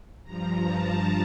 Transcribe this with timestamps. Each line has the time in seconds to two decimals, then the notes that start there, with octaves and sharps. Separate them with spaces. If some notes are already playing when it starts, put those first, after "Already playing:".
0.24 G2 F3 A#5
0.65 A5